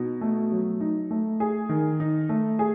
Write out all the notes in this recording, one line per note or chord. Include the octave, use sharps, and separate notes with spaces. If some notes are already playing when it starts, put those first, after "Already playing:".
Already playing: B2 D#4
A3
F#3
D#4
A3
G#4
D#3
D#4
A3
G#4